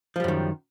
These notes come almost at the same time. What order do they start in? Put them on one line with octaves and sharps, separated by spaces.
F3 G3 F#2 D#3